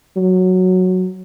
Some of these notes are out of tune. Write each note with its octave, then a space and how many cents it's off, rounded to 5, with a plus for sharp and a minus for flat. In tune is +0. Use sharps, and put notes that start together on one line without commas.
F#3 -5